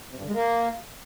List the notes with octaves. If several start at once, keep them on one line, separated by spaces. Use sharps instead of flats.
C3
G2
D3
G#3
A#3